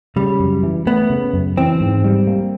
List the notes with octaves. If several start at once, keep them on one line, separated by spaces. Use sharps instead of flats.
C#3 G3
F#2
E3
A3 B3
C#3
F#2
E3 C4
G#2
G3
A#3